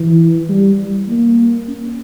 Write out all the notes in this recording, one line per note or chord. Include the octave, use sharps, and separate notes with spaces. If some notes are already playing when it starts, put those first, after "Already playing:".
Already playing: E3
G3
A#3
C#4